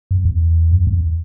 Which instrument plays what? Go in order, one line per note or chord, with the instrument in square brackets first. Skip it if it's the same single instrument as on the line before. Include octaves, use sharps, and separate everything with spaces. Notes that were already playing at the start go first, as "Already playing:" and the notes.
[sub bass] F#2
E2
F#2
E2